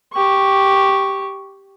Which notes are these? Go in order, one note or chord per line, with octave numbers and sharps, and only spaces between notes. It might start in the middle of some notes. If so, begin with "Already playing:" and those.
G4 C#6